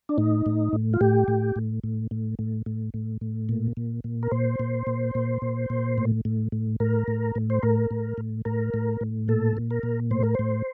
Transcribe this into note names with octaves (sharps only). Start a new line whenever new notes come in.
D4
A2 D#4
A2
A2
F4
A2 G4
A2
A2
A2
A2
A2
A2
A2
A2
A#2
A#2
A#2
A#4
A#2 C5
A#2
A#2
A#2
A#2
A#2
A2
A2
A2
A2 A#4
A2
A2
C5
A2 A#4
A2
A2
A2 A#4
A2
A2
A#2 A4
A#2
A#4
A#2
A2 C5
A#4
A2 C5